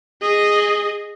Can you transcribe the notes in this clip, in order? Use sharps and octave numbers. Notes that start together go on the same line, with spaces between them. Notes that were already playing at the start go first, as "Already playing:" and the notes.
G#4 D#5